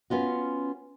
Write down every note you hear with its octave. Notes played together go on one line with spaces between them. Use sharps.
B3 C#4 F4 F#4